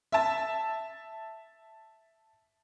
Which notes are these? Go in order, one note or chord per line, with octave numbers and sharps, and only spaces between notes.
E5 A5